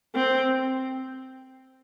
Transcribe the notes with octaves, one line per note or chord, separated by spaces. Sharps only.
C4